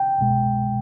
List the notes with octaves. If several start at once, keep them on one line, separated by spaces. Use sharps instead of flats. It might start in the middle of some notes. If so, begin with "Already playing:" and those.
Already playing: G5
C2 B2 G#3